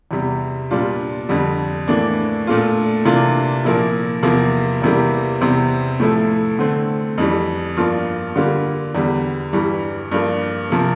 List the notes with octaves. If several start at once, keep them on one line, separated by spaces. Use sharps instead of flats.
E2 C3 G3
A#2 G3 D4 F4
F2 D3 G3
A2 E3 A#3 D4
A#2 A3 D4 F4
C3 E3 A#3 D4 F4
A#2 F3 A#3 E4
E2 C3 F3 A#3
E2 C3 E3 G3 A#3
E2 C3 G3 C4
A2 F3 A3 E4
D3 A3 C4
F2 E3 G3
G2 F3 A#3 F4
D3 G3 A#3 F4
E2 D3 G3
G2 E3 G3
G2 F3 A#3
C3 F3 A#3